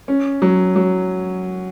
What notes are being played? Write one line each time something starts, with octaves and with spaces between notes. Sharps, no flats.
C#4
F#3
F#3